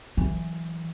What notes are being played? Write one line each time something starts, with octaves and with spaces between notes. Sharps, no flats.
E3 F#3